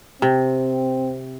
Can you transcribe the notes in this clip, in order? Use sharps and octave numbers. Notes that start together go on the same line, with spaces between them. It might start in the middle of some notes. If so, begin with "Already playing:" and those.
C3 C4